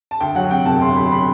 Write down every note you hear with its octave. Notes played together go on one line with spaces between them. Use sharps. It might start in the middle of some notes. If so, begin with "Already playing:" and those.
A5
D2 G5
F#3 F#5
C3 G5
E1 A5
D2 C6
F#3 B5
C6
C3 B5